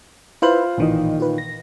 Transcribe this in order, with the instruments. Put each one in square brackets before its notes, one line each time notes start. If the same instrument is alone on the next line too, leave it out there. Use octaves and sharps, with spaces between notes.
[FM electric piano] E4 B4 E5 [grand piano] F4 C5 F#7
[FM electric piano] A1 E3 D#5 [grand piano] A#2 D#3
[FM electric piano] F4 B4
A#6